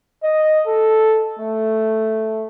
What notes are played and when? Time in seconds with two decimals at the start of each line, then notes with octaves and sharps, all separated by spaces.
0.23 D#5
0.67 A4
1.39 A3